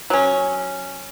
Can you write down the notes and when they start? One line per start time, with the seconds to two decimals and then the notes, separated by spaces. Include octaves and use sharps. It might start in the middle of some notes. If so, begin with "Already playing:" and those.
0.10 F#3 C#4